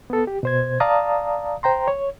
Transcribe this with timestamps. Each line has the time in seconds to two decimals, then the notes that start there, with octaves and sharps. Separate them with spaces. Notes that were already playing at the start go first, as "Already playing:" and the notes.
0.10 B3 A4
0.27 G4
0.43 B2 C5 G#6
0.80 D5 F5 A5 A#5 D#6
1.63 C5 G5 A#5 C6
1.88 C#5